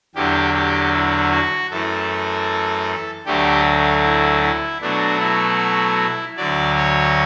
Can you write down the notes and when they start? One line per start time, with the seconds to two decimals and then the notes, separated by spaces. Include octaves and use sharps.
0.15 E2 D3 F#3 G4
0.54 G4
0.93 E4
1.31 F#4
1.70 F#2 E3 A3 A4
3.26 D2 D3 F#3 A3 G4
4.04 E4
4.43 E4
4.82 B2 F#3 A3 D4
5.20 E4
6.37 D2 D3 F#3 D5
6.76 C#5